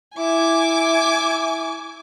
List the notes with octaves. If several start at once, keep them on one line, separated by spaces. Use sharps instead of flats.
E4 G#5 D6